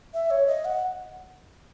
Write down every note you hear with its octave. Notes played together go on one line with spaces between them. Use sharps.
E5
C#5
D#5
F#5